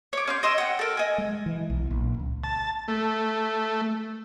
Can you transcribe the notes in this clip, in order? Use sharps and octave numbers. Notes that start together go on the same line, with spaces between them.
C#5 D6
C#4 C6 G6
D#5 C6 D6 E6
F#5 G5
A4 A#4
D#5 G#5
G#3
E3
B1
A#1
C#2
A5
A3